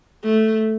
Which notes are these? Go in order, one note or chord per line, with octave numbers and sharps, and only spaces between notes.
A3